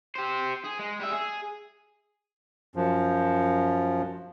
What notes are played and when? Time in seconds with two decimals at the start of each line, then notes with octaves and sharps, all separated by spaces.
0.15 G4 C5
0.64 G#4
0.79 G#3
1.00 G3 E5
1.11 G#4
2.76 F#2 F3